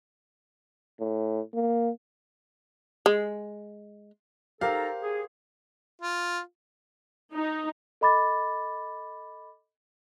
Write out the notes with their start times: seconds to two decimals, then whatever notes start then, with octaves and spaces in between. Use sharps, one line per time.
1.00 A2
1.54 A#3
3.06 G#3
4.61 D#4 G4 A4 A#4 C5 F5 A#5
5.03 G#4
6.02 F4
7.33 D#4
8.01 A4 D#5 B5 D6 A6